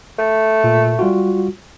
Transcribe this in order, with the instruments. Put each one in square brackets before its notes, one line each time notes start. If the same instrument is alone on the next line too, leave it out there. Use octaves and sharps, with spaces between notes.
[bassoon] A3
[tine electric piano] A#2
G3 F4 F#4